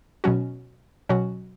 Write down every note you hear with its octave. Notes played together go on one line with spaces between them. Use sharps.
B2 F#3 C#4 F#4
B2 F#3 C#4 F#4